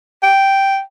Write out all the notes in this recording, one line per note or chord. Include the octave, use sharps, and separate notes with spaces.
G5